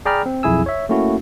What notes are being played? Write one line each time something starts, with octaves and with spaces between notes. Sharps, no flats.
G#4 D5 G5 A#5 B5 F6
C4
B1 F2 E4 G#4 G#5 E6
C#5 E5
A3 A#3 C#4 E4 F#4